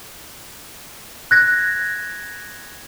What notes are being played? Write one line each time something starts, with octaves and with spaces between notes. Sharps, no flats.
F#6 G#6 A#6